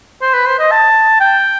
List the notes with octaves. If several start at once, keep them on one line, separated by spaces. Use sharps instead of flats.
C5
B4
C5
D#5
A5
G5